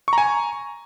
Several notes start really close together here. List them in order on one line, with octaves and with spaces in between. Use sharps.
C#6 A#5 G#5